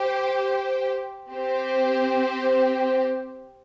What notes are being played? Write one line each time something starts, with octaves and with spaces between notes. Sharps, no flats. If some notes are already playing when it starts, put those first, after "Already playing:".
Already playing: G4 C5 G5
C4 G4 C5